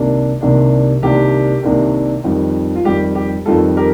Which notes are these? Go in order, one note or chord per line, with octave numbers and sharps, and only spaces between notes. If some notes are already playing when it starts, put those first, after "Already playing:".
Already playing: C2 C3 D#3 A#3 D4
C2 C3 D#3 A#3 D4
C2 C3 D#3 A#3 D4 G4
C2 C3 D#3 A#3 D4
F2 D#3 G3
F4
F2 D#3 G3 G4
G4
F2 D#3 G3 F4 A4
G4 A#4